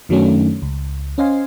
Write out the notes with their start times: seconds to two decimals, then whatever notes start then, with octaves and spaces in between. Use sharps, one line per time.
0.09 F#2 D#3 F#3 A3 C#4 D4
0.62 C#2
1.18 C#4 C5 D#5 F5 G#5 C6